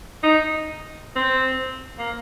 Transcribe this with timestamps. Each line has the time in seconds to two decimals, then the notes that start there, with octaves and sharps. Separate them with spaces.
0.23 D#4
1.16 C4
1.99 A#3